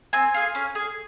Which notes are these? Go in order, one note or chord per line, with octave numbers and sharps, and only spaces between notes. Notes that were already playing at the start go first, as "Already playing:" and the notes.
C4 G#5
F4 G#4
C#4
G#4